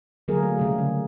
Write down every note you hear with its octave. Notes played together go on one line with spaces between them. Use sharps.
D3 F#3 A#3 G#4 A#4
A3
C#3 G3 G4
D3 A3